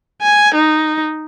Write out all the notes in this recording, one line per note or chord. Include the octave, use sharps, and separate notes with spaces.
G#5
D#4